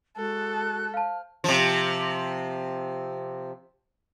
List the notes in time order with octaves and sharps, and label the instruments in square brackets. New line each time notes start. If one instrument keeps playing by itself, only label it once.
[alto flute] G#3 [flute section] F#4 A5 F#6 [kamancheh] A4
[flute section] C5 F6 [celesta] F5 A5
[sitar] C3 F3